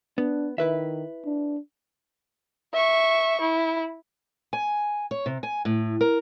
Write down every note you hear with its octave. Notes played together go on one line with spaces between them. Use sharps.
B3 D4
D#3 E4 B4 E5
D4
E5 C#6
E4
G#5
C#5
C3
G#5
A2
A#4